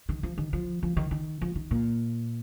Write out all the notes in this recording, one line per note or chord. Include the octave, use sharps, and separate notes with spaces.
D#3
F3
D#3
F3
F3
D#3
D#3
F3
D#3
A#2